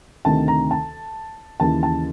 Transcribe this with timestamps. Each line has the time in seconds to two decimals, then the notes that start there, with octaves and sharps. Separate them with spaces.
0.25 D2 C3 D#3 A5
0.48 A#5
0.71 A5
1.60 D#2 C#3 E3 A5
1.83 A5